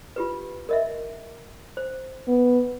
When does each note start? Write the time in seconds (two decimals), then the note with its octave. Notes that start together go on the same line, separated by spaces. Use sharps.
0.16 F4 G4 B4
0.69 A#4 D#5 E5
1.77 C5
2.28 B3